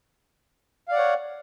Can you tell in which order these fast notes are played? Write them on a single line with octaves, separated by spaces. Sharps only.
F5 D5 F#5 C#5